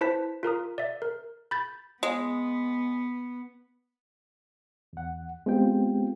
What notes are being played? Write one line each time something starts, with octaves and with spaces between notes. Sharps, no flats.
E4 B4 C5 A5 B6
F4 A#4 A#5 D#6
D5 E5
A#4
B5 G6 A6
G#3 B3
E2 F#5
G#3 B3 C4 F4 G4 G5